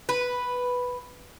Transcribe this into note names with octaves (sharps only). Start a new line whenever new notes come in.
B4